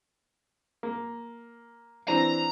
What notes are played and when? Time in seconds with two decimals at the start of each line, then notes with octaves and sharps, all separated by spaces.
0.83 A#3
2.08 E3 C4 D4 A#5